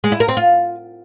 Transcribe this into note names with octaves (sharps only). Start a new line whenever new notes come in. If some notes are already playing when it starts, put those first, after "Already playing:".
G#3
E4
A#4
C4
F4